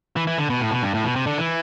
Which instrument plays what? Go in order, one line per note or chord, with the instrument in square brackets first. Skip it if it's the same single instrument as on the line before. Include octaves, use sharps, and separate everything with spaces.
[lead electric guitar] E3
E3
D3
B2
A2
B2
G2
A2
B2
C3
D3
E3